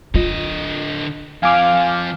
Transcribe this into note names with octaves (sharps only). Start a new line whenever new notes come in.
D3 F4 D#5
F2 F3 F5 G#5 D6 F6